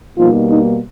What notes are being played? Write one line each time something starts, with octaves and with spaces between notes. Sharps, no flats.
B2 F3 G3 A#3 D#4 F4
D#4